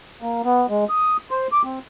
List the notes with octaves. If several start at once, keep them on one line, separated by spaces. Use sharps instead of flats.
A#3
B3
G#3
D#6
C5
D6
C4